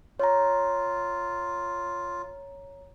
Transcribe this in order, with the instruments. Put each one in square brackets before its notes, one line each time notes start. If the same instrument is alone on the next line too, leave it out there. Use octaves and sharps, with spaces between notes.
[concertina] F4 [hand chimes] C#5 A#5